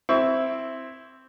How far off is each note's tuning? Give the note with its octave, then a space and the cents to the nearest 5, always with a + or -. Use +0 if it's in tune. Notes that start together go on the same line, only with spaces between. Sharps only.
C4 +0 E4 +0 C#6 +30